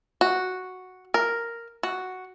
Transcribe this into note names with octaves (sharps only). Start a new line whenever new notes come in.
F#4
A#4
F#4